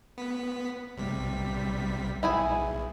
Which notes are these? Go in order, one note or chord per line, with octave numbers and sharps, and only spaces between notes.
B3 B6
B1 C3 G3 B6
B1 E4 G#4 G#5